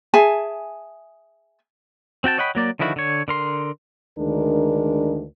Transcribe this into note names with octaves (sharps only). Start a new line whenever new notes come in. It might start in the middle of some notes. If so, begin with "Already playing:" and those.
G#4 E5 G#5 A5
C4 F#4 G5 A5
C#5 D#5 F#5 G5 B5
F#3 A#3 D5
D3 D#3 F3 E4 F#4
D3 C#5
D3 A#4 C6
D2 D#3 G#3 D4 A#4